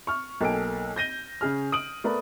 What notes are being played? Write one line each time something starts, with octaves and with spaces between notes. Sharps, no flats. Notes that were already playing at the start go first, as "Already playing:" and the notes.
C#6 F6
B1 A#3 A4 G5 G#5 D7
G6 A#6 D#7 G7
C#3 C#4 G#4 F6
D#6 D7 F#7
A3 B3 A#4 D5